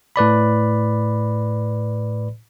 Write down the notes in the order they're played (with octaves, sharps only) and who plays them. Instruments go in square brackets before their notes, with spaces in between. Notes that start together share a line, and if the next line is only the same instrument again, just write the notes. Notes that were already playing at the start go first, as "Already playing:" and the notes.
[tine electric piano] A2 B4 D5 B5